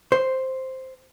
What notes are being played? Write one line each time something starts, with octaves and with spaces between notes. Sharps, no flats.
C5